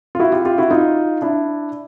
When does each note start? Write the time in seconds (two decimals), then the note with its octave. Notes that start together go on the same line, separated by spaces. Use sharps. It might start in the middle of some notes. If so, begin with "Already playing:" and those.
0.15 F4
0.19 E4 F#4
0.32 F4 G4
0.45 F4 G4
0.58 E4 F#4
0.71 D#4 F4
1.22 D4 E4